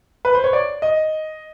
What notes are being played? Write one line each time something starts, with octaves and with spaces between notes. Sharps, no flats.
B4
C5
C#5
D5
D#5